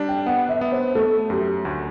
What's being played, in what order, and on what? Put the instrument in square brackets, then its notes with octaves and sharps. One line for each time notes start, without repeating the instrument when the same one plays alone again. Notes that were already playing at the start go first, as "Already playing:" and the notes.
Already playing: [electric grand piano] G3 D4
[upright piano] G5
[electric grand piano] B3 [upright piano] F#5
[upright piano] E5
[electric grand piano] B3
[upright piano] C5
[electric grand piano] A3 [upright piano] A4
[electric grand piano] F#2 [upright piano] G4
[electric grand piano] D2